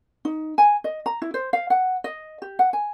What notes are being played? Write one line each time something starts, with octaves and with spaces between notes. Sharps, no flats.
D#4
G#5
D#5
A#5
E4
C5
F5
F#5
D#5
G4
F#5
G#5